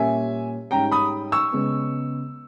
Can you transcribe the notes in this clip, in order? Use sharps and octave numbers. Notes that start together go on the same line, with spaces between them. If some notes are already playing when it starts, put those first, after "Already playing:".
Already playing: A#2 G3 C#4 E5 G#5
G#2 G3 C#4 G5 A#5
B5 D#6
C#6 E6
C#3 G#3 B3